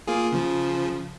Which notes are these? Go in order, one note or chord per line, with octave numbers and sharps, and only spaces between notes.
A#3 F4 G#4
C#3 F3